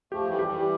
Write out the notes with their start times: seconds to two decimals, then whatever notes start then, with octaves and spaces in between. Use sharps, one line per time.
0.12 F3 A3 G4
0.29 E3 G3
0.39 G4
0.47 E3 G3